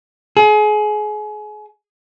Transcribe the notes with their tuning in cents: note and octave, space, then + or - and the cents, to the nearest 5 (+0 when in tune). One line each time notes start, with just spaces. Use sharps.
G#4 +30